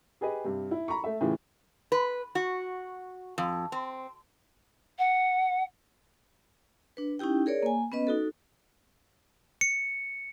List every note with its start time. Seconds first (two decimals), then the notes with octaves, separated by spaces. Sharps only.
0.21 G4 G#4 B4 D#5
0.44 G2 C3
0.71 E4
0.88 A#5 B5 C#6
1.04 A3 E5
1.21 A2 C#3 E3 F4 G4
1.92 B4
2.35 F#4
3.38 F2
3.72 C4
4.98 F#5
6.97 D4 B4
7.19 C#4 D#4 E4 G4 G5
7.46 G#4 A#4 C#5 D5
7.63 A#3 G#5
7.92 B3 C#4 B4 D#5
8.07 D#4 F#4 A4
9.61 C#7